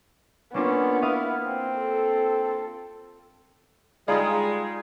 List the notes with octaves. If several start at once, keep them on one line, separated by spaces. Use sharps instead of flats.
A#3 B3 C#4 D4 F4
E4 F5 D#6 F6
C4
A4
G3 G#3 D#4 F4 G#4 D5 B5